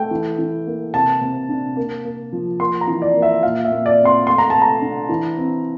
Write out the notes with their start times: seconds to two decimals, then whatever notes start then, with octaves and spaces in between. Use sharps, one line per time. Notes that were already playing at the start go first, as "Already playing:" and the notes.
Already playing: A3 G5
0.11 E3
0.39 E3
0.67 A#3
0.94 C3 A5
1.21 C3
1.49 D4
1.77 A#3
2.05 A#3
2.33 F3
2.60 A#3 C6
2.81 A#5
2.88 E3
3.02 D5
3.16 A#3
3.22 E5
3.43 A#2 F5
3.65 E5
3.72 A#2
3.86 D5
3.98 C4
4.05 C6
4.26 A3 C6
4.38 A#5
4.50 A3 A5
4.62 A#5
4.82 D4
5.09 E3
5.37 C4